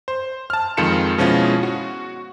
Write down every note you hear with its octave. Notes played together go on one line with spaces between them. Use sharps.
C5
A5 F6
F2 D#3 G#3 F4 C#7 E7
B2 F3 G#3 C#4 E4 F4
F#4